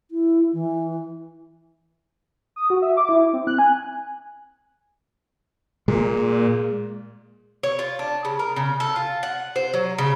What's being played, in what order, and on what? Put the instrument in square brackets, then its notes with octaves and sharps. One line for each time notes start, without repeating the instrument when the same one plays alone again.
[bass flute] E4
E3
[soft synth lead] D#6
F#4
E5
D6
E4
C4
F#6
G#5
[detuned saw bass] A#2 [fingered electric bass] G#3
[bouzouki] C#5
F4
D4
C#3
A#4
C#3
A4
F4
F#5
C5
F#3
C#3